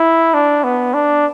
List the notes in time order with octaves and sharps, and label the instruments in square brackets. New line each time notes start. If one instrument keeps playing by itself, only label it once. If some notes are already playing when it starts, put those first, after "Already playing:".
Already playing: [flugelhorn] E4
D4
B3
D4